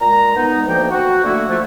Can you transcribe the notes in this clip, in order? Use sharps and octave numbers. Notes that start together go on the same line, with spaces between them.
A#2 G#3 A#5
B3 D#4
D2 F3 A#3 G5
F#4
D3 A3 A#3 E4 F#4
F3 A3